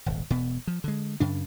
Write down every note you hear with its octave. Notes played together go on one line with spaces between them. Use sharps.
D#1 G#1
E1 B2 B3
F3
D3 G#3
F#2 C#3 D4